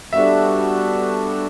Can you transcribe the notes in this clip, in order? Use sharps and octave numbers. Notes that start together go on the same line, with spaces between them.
G3 B3 D4 F#4 A4 E5